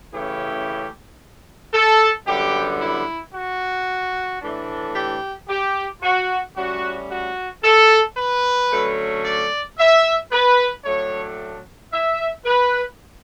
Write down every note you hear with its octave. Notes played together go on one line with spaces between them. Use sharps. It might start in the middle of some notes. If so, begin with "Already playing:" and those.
C#3 E3 A3 C#4 E4 G4
A4
F#2 D3 G3 B3 G4
E4
F#4
A2 E3 A3 D4
G4
G4
F#4
A2 G3 C#4 F#4
F#4
A4
B4
D3 F#3 A3 C#4
D5
E5
B4
A2 F#3 A3 D4 C#5
E5
B4